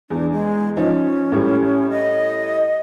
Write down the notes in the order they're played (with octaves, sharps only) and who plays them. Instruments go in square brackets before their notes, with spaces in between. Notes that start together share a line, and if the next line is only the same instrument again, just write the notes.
[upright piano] E2 [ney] D4
[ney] G#3
[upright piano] F3 D#4 [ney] C#4
[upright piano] A2 G3
[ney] D#5